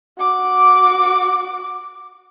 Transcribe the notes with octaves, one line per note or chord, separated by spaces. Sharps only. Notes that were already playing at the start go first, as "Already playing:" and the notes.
F#4 D6